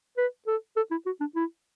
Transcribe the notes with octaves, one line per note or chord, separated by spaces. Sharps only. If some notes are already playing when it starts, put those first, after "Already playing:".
B4
A4
A4
E4
F#4
D4
E4